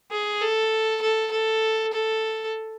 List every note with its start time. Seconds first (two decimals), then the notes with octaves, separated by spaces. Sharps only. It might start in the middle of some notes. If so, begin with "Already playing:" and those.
0.11 G#4
0.41 A4
1.02 A4
1.31 A4
1.93 A4